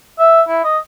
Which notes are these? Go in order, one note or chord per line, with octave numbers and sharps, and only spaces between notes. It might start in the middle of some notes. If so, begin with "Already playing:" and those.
E5
E4
D#5